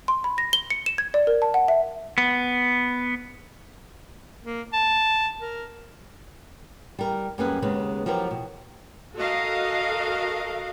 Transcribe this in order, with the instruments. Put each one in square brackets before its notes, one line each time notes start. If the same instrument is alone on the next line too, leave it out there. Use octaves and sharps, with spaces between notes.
[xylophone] C6
B5
A#6
G7
C#7
E7
G#6
D5
A#4
A5
F#5
E5
[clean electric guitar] B3
[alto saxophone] A#3
A5
A#4
[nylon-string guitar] G3 A#4
F#2 G3 A#3 C#4 G#4 B4
D#2 C#3 G#3 B3 B4
F3 F#3 B3 G4 A#4
B2
[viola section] F#4 A4 A#4 D#5 F5